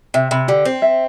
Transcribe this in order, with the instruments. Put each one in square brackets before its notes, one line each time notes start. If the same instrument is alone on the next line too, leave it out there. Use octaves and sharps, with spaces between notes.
[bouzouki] C3 [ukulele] E5
[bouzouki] C3 [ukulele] B5
[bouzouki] D3 [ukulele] G4
[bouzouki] C4 [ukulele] C5
[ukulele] E5